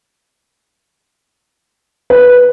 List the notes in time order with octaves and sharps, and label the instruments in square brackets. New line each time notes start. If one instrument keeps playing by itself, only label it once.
[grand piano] B4